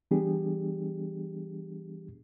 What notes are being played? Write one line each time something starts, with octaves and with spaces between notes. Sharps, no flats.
E3 G3 B3 D4 G4 G#4